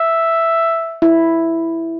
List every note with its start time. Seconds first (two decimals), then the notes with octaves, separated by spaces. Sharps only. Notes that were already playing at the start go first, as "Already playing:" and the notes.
Already playing: E5
1.02 E4